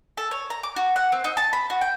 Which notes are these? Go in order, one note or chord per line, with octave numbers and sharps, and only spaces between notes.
A4
C#5
A#5
D6
F#4
F#5
C4
D#4
A5
B5
F#4
G5